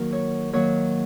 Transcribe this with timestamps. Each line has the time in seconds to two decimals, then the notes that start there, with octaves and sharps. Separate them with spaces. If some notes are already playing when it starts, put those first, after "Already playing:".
Already playing: D#3 F#3 A#3 F#4 A#4
0.13 C#5
0.53 D#3 F#3 A#3 C#5